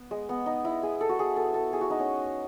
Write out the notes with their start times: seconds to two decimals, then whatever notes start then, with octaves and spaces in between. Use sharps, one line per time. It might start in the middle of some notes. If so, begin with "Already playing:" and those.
Already playing: B3
0.11 G#3
0.29 B3
0.46 D#4
0.65 E4
0.83 G#4
1.01 A4
1.09 F#4
1.19 G#4
1.36 A4
1.54 A4
1.73 G#4
1.81 F#4
1.90 D#4
2.00 C#4